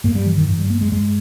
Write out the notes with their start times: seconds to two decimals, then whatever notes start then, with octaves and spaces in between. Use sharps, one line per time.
0.04 G2 A#3
0.15 G3
0.26 E3
0.37 D#3
0.48 G2 E3
0.59 G3
0.70 A#3
0.81 G#3
0.92 G2 G#3